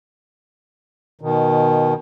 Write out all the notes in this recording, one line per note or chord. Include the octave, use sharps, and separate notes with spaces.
B2 D#3